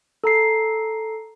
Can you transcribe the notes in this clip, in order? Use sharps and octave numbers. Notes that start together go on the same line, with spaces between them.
A4 A#5 C7